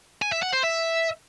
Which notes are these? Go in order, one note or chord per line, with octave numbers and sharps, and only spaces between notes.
G#5
E5
F#5
C5
E5